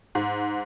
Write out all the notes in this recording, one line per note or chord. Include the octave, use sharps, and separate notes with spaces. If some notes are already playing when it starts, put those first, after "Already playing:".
G#2